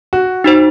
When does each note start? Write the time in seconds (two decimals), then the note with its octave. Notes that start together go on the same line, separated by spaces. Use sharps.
0.13 F#4
0.44 D#4 F#4 C5